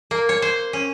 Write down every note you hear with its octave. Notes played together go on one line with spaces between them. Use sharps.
A#3
C#5
C5
C#4